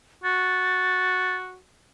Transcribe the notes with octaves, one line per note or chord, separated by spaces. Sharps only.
F#4 A6